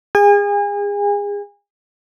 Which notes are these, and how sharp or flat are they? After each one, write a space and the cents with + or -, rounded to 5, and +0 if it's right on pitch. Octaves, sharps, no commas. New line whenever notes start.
G#4 -30 G#5 -35